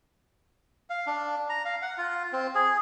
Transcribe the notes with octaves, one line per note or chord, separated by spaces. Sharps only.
F5
D4
A#5
F5
F#5
F4
C4
G#4